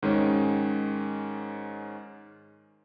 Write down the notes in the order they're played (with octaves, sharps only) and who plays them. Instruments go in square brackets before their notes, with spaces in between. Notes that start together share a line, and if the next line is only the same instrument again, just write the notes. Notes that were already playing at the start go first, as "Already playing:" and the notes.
[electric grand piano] G#2 D#3 G#3 C#4